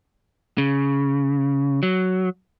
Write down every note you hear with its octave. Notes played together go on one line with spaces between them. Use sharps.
C#3
F#3